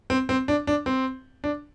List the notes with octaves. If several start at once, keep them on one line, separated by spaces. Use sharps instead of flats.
C4
C4
D4
D4
C4
D4